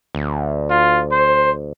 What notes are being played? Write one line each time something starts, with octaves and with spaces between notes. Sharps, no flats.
D2
F4
C5